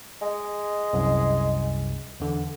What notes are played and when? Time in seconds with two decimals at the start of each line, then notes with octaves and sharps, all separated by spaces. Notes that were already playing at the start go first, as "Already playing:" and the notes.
0.22 G#3
0.93 C2 F#2
2.20 E2 D3